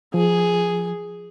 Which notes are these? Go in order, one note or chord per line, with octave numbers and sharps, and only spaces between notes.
F3 G#4